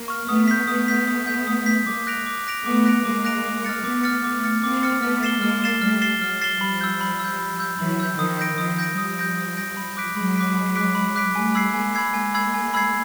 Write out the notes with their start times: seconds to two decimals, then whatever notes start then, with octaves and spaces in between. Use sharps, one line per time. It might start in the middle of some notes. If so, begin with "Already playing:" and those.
Already playing: A#3
0.08 C#6 F6
0.28 A3 B3 D#6
0.48 G6 B6
0.68 A3 B3 D#6
0.88 G6 B6
1.07 D#6
1.27 G6 B6
1.47 D#6
1.66 G6 B6
1.86 G#3 A#3 D6
2.07 F#6 A#6 D7 F7
2.26 D6
2.46 F#6 A#6 D7 F7
2.65 A3 B3 D6
2.85 F#6 A#6 D7 F7
3.05 G#3 A#3 D6
3.25 F#6 A#6 D7 F7
3.45 D6
3.64 F6 A6 C#7
3.84 A3 B3 D6
4.03 F6 A6 C#7
4.23 A3 B3 D6
4.44 F6 A6 C#7
4.63 A#3 C4 D6
4.83 F6 A6 C#7
5.02 A3 B3 F6
5.23 A6 C7 E7 G7
5.42 G#3 A#3 F6
5.62 A6 C7 E7 G7
5.82 G3 A3 F6
6.02 A6 C7 E7 G7
6.21 F#3 G#3 F6
6.41 A6 C7 E7 G7
6.61 F3 G3 B5
6.81 E6 G6
7.01 B5
7.20 E6 G6
7.39 B5
7.59 E6 G6
7.79 E3 F#3 B5
8.00 E6 G6
8.18 D#3 F3 D#6
8.39 G6 A#6 D7
8.58 D#3 F3 D#6
8.79 G6 A#6 D7
8.98 F3 G3 D#6
9.18 G6 A#6 D7
9.37 D#6
9.57 G6 A#6 D7
9.77 B5
9.97 D6 F#6 B6 D7
10.16 F#3 G#3 B5
10.36 D6 F#6 B6 D7
10.55 B5
10.76 D6 F#6 B6 D7
10.95 B5
11.15 D6 F#6 B6 D7
11.35 G3 A3 G#5
11.55 B5 E6 G#6 C7
11.74 G#3 A#3 G#5
11.95 B5 E6 G#6 C7
12.14 G#3 A#3 G#5
12.34 B5 E6 G#6 C7
12.54 G#5
12.74 B5 E6 G#6 C7